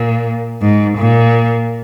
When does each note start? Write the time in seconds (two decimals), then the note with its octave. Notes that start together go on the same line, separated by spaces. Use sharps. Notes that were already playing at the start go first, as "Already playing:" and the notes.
Already playing: A#2
0.62 G#2
0.98 A#2